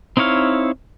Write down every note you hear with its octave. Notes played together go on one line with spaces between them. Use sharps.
C4 D#4 E4 C#5 F5